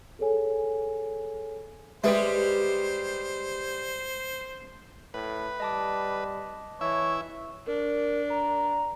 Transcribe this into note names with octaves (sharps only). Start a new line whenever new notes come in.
G#4 A4 C#5 G#5
G3 G#3 G4 B4 C5 E5
A2 B4 B5
G3 D#5 A5 D6
E3 E4 C#5 E5
D4 A#4
A#5